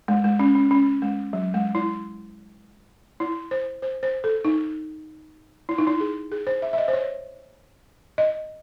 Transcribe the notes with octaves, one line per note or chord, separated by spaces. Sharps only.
G#3
G#3
C#4
C#4
C#4
G#3
F#3
G#3
E4
E4
C5
C5
C5
A4
D#4
E4
D#4
E4
G#4
G#4
C5
E5
E5
D#5
C5
C#5
D#5